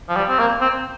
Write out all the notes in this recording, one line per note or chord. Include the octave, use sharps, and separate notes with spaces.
F3
G3
C4
A#3
C4